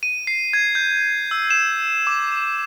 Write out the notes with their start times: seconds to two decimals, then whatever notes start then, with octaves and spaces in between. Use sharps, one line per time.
0.03 D#7
0.27 C7
0.53 G#6
0.75 G6
1.31 E6
1.50 E7
2.07 D6